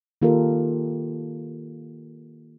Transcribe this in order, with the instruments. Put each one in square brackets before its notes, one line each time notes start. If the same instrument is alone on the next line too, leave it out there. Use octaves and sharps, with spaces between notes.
[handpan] D#3 A#3 F4 G4 A4 A#4